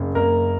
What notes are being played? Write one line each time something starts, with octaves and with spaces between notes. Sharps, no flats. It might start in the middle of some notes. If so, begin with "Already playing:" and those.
Already playing: F#1 F#2 C#4
F#1 A#3 A#4